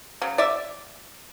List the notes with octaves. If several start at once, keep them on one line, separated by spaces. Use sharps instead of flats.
C#3 F#3
D5 E5